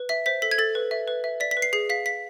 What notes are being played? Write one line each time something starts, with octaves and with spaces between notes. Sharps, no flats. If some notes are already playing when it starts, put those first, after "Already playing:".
Already playing: B4
E5 B6
C5 B6
A4 B6
G#6
A4 A6
B4
E5
B4
E5
D5 B6
B6
B4
C7
G#4 C7
F5 B6
F5 B6